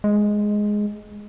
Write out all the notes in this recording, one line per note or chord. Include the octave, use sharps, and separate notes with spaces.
G#3